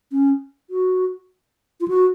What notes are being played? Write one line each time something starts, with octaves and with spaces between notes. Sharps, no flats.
C#4
F#4
F4
F#4